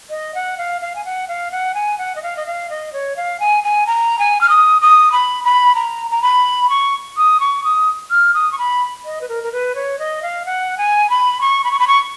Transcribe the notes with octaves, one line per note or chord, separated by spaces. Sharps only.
D#5
F#5
F5
F5
G#5
F#5
F5
F#5
G#5
F#5
D#5
F5
D#5
F5
D#5
C#5
F5
G#5
G#5
A#5
G#5
F6
D#6
D#6
B5
B5
A#5
A#5
B5
C#6
D#6
C#6
D#6
F6
D#6
C#6
B5
D#5
B4
A#4
A#4
B4
C#5
D#5
F5
F#5
G#5
B5
C#6
B5
C#6
B5
C#6